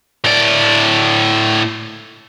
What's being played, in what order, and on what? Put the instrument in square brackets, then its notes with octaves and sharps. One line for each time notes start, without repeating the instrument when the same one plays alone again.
[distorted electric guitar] A2 D5